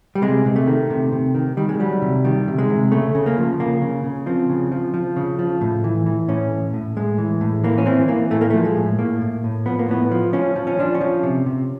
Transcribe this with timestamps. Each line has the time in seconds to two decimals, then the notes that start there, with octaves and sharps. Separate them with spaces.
0.15 G3
0.22 C3 G#3
0.46 C3
0.56 A3
0.67 D#3
0.90 C3
1.13 C3
1.35 D#3
1.57 D#3 G3
1.69 G#3
1.80 F#3 G3
2.02 C3
2.25 D#3 G3
2.48 C3
2.58 G#3
2.70 C3
2.92 C#3 A3
3.15 C#3
3.26 A#3
3.38 F3
3.60 C#3 A#3
3.81 C#3
4.04 C#3
4.26 F3 C4
4.50 C#3
4.72 F3
4.94 F3
5.16 C#3
5.39 F3
5.61 A2
5.84 E3
6.06 E3
6.28 A2 C#4
6.52 A2
6.73 A2
6.96 A2 G#3
7.18 E3
7.41 A2
7.64 E3 A#3
7.78 C#4
7.86 E3 C4
8.08 E3 A#3
8.31 A2 A3
8.41 A#3
8.50 F3 A3
8.65 G#3
8.76 A2
8.99 A2 A#3
9.21 A2
9.44 A2
9.66 F3 B3
9.79 A#3
9.89 A2 B3
10.11 F3
10.33 F3 C#4
10.56 F3
10.67 C#4
10.79 F3 D4
10.95 C#4
11.01 F3
11.23 C3
11.46 C3